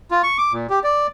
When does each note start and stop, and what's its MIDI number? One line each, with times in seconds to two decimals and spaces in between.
0.11 0.22 65
0.23 0.37 85
0.38 0.52 86
0.53 0.67 46
0.70 0.79 67
0.84 1.07 74